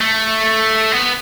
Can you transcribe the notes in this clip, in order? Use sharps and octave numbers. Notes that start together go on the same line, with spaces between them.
A3
B3